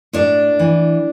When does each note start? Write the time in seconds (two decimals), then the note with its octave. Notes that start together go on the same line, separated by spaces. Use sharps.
0.13 A2 D4
0.59 E3